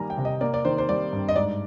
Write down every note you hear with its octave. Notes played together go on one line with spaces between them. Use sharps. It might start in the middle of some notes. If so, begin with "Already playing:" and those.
Already playing: D#3 G3 A#3 G#5 A#5
G5
C3
D#5
A#3 D5
D5
D#3 C5
C5
G3 D5
G2
D#5
G#2 D5